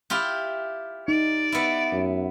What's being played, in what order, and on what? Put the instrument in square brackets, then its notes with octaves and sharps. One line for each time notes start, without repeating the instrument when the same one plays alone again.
[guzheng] E4 F4 G4
[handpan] D#4 [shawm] D5
[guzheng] B3 E4
[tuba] F#2